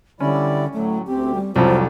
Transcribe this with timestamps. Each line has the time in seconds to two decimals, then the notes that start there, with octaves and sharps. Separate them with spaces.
0.20 D3 G3 C#4 E4 D5
0.74 A2 F#3 A3
1.07 D2 C4 G4
1.35 G3
1.56 C2 F2 F#3 F4 A4 C5